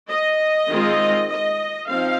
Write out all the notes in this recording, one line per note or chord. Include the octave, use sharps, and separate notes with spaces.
D#5
D#3 G#3 C4 F4
D#5
F3 C4 D#4 F5